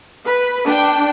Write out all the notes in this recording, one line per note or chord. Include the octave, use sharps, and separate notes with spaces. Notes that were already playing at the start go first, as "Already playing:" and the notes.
B4
D4 G5